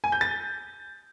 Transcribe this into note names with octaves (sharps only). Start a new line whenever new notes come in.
G#5
G6
A6